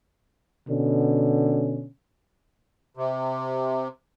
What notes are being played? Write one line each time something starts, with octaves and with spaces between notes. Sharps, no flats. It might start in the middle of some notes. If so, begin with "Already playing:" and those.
B2 D3 C#4
C3